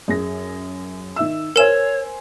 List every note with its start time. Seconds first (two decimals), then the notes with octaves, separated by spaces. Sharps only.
0.08 F#2 G#4 A#6
1.16 D#3 E5 E6
1.56 A#4 C5 C#5 G#5 E6 E7